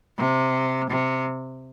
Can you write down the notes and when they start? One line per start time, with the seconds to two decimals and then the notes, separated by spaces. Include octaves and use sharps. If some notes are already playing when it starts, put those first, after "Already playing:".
0.18 C3
0.89 C3